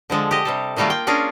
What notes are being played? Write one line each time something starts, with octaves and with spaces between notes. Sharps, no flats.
D3 F3 G#3 A4
G4 D#5
C3 G3 A4
D#3 F#3 G3 A3 A#3 F4
G5
C#4 D4 F4 G#4 A#4